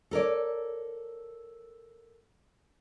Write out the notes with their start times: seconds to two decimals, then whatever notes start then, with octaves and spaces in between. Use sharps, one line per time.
0.11 A4 A#4 C#5 D5